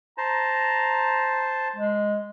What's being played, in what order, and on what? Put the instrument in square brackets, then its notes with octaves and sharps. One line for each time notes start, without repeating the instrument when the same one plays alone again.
[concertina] C5 A5 [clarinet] A#5
[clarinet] G#3